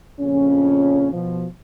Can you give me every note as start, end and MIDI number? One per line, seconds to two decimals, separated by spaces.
0.20 1.08 34
0.20 1.08 41
0.20 1.08 49
0.20 1.08 61
1.13 1.45 47
1.13 1.45 53